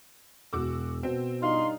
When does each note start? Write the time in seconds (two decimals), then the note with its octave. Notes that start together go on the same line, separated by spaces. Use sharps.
0.53 E1 F#4 D6 E6
1.03 B2 C4
1.42 G2 D4 D#4 F4 C6